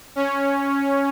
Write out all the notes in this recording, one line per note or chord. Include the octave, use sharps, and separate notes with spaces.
C#4